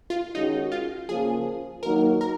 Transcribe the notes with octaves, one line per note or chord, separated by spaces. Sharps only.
F4
D#3 G#3 C#4 D#4 F#4
F4
C#3 F3 A#3 F4 G#4
D#3 F#3 A#3 D#4 F#4 A#4
A#4